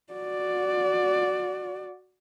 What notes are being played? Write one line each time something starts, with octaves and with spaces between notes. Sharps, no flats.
F#4 D5